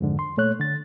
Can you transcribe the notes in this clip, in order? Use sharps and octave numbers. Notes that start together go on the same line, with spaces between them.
F2 G#2 D3
C6
A#2 A3 C#5 F#6
D3 A6